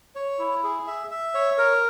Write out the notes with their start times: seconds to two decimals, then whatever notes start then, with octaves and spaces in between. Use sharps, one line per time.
0.15 C#5
0.39 E4
0.63 G#4
0.87 E5
1.11 E5
1.34 C#5
1.58 A#4